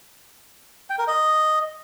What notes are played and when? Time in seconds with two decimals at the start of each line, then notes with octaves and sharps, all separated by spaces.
0.90 G5
0.99 A#4
1.07 D#5